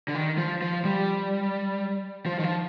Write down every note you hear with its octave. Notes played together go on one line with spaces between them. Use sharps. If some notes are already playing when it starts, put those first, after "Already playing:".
D3
D#3
F3
F3
G3
F3
D#3
F3